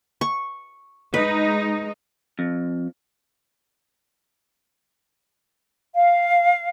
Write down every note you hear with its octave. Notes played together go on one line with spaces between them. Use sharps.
C#6
G#3 D#4 B4
F2
F5